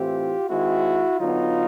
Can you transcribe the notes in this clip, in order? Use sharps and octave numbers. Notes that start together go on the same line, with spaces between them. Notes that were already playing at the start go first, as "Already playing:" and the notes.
Already playing: A2 E3 A3 C4 F4 G4
D#3 G#3 C4 E4 F#4
D3 F#3 B3 D#4 F4